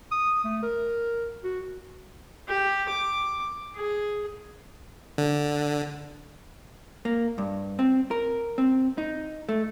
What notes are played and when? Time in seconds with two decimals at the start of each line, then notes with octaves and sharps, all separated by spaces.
0.11 D#6
0.44 A3
0.63 A#4
1.44 F#4
2.48 G4
2.89 D6
3.76 G#4
5.18 D3
7.05 A#3
7.38 G2
7.79 C4
8.11 A#4
8.58 C4
8.98 D#4
9.49 A3